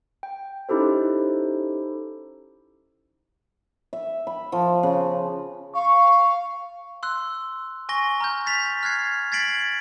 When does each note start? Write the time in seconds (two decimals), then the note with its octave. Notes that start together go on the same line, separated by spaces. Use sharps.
0.23 G5
0.69 C#4 D#4 E4 G4 A4 C5
3.93 E5
4.27 B5
4.52 F3
4.83 C#3
5.74 F5 C#6
7.03 C6 E6 F#6
7.89 G#5 C#6 A#6 G7
8.20 A#5 F6 G6
8.46 A6 B6 F7
8.83 F6 F#6 G#6 C7
9.32 G#6 A6 B6 C7 D7 F#7